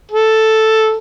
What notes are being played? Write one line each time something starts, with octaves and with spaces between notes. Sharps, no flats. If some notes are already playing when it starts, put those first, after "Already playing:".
A4